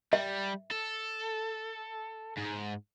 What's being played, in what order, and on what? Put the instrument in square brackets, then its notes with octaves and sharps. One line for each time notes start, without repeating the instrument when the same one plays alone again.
[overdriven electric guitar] G3 [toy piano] E5
[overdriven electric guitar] A4
G#2